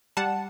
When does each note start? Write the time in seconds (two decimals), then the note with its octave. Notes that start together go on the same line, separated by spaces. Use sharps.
0.17 G3 F#5 A5